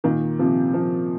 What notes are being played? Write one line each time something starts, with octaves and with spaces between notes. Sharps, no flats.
A#2 D#3
C3 F3
C3 F3